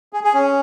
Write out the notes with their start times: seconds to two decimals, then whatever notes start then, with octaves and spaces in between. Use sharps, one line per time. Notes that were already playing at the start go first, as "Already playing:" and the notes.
0.13 G#4
0.24 G#4
0.34 C#4